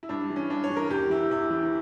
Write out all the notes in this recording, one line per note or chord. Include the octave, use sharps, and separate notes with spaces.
E4
G2 D4
E3
C#4
G2 D4
C#5
E3
A#4
E2 G4
E3 E4
E2 E4
E3